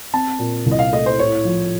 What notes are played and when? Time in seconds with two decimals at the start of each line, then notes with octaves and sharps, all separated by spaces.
0.14 C4 A5
0.39 A#2
0.66 C2
0.72 D#5
0.79 F5
0.93 A3 D#5
1.06 C5
1.19 A2 C#5
1.45 F3